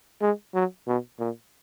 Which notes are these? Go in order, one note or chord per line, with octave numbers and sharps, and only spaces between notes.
G#3
F#3
B2
A#2